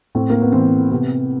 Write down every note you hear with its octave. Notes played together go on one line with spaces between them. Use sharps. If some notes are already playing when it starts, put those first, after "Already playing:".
A2 C4
A#3
B3
E3 C4
C3 B3